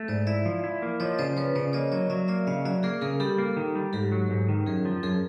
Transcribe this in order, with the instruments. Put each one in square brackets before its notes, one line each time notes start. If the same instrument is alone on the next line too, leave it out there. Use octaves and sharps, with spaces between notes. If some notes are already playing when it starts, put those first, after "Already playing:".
Already playing: [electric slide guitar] A3
[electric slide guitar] G#2 [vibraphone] C5 D5
[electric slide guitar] E4 [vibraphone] D5 E5
[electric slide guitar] F3
E4
A#3
[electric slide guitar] F3 [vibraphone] C#5 D#5
[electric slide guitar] C#3 [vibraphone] C5 D5
[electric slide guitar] F3 [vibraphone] B4 C#5
[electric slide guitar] C#3 [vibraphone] C5 D5
[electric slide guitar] A#3 [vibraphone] C#5 D#5
[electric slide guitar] F#3 [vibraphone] C#5 D#5
[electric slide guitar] F#3 [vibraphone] D5 E5
[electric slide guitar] A#3 [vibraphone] D5 E5
[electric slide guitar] C#3 [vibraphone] D#5 F5
[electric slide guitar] F#3 [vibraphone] D5 E5
[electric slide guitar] A#3 [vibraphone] G#4 A#4
[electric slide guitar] C#3 [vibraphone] G#4 A#4
[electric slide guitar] G3 [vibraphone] G4 A4
[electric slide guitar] A#3
D#3
G3
[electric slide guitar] G#2 [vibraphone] G4 A4
[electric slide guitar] F#3
G#2
D#3
[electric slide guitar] F#2 [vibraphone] G#4 A#4
[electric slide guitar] F3
[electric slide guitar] F#2 [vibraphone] G#4 A#4